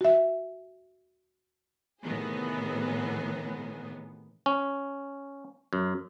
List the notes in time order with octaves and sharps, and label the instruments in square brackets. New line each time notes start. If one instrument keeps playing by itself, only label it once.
[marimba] F#4 E5
[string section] A2 C3 D#3 E3 B3 G#4
[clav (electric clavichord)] C#4
F#2